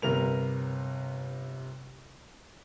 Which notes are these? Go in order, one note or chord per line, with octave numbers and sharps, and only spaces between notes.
G1 C3 A#4 B4 F7